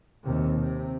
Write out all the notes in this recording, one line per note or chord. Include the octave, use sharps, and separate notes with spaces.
D#2 C3
C3